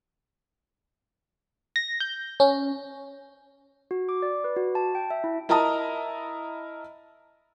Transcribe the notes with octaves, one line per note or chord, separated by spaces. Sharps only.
A#6
G6
C#4
F#4
D6
D5
B4
F#4
A5
G5
E5
E4
E4 A#4 D#5 A5 A#5 D#6